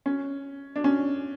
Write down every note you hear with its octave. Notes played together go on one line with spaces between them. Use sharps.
C#4
D4
C#4